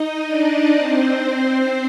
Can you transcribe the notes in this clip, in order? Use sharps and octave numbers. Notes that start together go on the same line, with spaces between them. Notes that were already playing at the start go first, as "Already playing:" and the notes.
Already playing: D#4 D#5
D4 D5
C4 C5